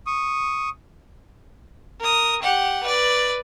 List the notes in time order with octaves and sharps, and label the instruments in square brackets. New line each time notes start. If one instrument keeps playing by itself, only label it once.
[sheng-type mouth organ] C#6 D#6
[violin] A#4 D#6
G4 F#5
B4 D5